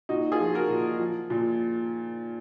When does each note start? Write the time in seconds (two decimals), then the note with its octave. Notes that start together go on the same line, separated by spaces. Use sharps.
0.09 A#2 D#4 F#4
0.32 F4 G#4
0.40 F3
0.55 F#4 A#4
0.69 A#2
0.99 F3
1.30 A#2